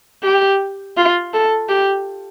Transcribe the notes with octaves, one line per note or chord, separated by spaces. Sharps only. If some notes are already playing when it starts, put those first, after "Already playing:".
G4
F4
A4
G4